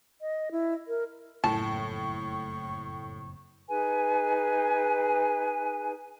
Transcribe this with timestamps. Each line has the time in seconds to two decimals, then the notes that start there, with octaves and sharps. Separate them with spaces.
0.21 D#5
0.52 E4
0.88 A#4
1.44 F#1 F2 A2 A5 C#6
3.69 D#4 G#4 B4 G#5